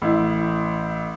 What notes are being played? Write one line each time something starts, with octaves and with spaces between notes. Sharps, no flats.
A1 E4